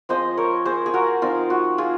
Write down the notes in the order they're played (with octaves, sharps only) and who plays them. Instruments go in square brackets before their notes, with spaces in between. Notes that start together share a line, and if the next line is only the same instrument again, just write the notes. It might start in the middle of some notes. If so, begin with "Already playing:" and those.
[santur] F3 G#3 C4 C5 D#5
A#4 C#5
G#4 C5
G#4
F#4 A#4
F3 C4 D#4 F4
F#4
F4 G#4